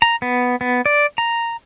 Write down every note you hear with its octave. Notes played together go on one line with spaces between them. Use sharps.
A#5
B3
B3
D5
A#5